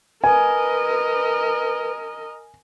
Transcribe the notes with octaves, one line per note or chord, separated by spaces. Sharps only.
A#4 B4 D#5 G#5